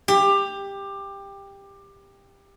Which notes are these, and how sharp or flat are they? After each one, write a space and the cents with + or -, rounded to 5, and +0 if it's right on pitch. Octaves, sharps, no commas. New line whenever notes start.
G4 +15